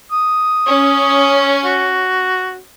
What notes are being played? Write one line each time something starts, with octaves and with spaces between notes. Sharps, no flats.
D#6
C#4
F#4